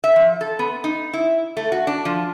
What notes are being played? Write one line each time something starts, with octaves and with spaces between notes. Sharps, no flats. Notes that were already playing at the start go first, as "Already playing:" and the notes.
E5
F3
A4
B3
D#4
E4
A3
F#4
D4
F3